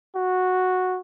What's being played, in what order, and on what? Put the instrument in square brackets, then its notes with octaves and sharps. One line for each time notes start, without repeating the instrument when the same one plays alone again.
[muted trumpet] F#4